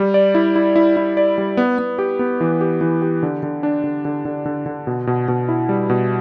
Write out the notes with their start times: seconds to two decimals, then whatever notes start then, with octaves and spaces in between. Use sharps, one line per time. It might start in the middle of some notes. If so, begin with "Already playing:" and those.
Already playing: G3
0.14 D5
0.35 E4
0.56 E4
0.76 E4
0.97 E4
1.17 D5
1.38 G3
1.57 B3
1.79 B3
1.99 G4
2.19 B3
2.41 E3
2.61 G4
2.81 E3
3.02 G4
3.23 D3
3.43 D3
3.63 D4
3.84 D3
4.05 D3
4.25 D3
4.46 D3
4.66 D3
4.87 B2
5.07 B2
5.28 B2
5.49 E4
5.69 G3
5.90 B2